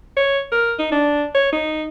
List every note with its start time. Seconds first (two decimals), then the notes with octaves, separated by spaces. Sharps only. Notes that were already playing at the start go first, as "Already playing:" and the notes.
0.16 C#5
0.52 A#4
0.79 D#4
0.92 D4
1.35 C#5
1.52 D#4